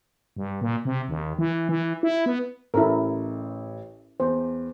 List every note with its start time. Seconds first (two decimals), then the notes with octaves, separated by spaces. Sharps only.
0.36 G2
0.61 A#2
0.85 C3
1.09 D#2
1.39 E3
1.69 E3
2.03 E4
2.26 B3
2.74 A1 E4 A4 A#4
4.20 E2 C5